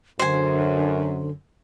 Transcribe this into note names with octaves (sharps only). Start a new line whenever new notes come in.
F#2 D3 C5 G#5